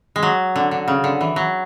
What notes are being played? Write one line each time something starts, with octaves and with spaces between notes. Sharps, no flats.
G#3
F#3
D3
D3
C#3
D3
E3
F#3